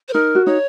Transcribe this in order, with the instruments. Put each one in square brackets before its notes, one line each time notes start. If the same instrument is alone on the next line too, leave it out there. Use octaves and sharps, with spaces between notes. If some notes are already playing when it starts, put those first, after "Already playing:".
[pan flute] C5
[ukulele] D#4 [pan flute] A#4
[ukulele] F#4
[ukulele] D#4 [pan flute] C#5